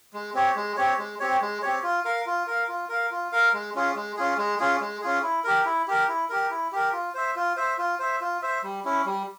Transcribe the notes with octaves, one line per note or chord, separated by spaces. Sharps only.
G#3
C4 G4 C#5
G#3
C4 G4 C#5
G#3
C4 G4 C#5
G#3
C4 G4 C#5
F4
A#4 F5
F4
A#4 F5
F4
A#4 F5
F4
A#4 F5
G#3
C#4 F4 G#4
G#3
C#4 F4 G#4
G#3
C#4 F4 G#4
G#3
C#4 F4 G#4
E4
G4 A#4
E4
G4 A#4
E4
G4 A#4
E4
G4 A#4
F4
C5 E5
F4
C5 E5
F4
C5 E5
F4
C5 E5
G3
C#4 E4
G3